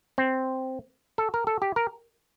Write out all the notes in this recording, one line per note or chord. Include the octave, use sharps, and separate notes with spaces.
C4
A4
A#4
A4
G4
A#4